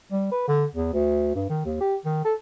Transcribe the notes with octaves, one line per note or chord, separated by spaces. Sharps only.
G3
B4
D3
E2
D2
G2
D#3
D#2
G4
D#3
A4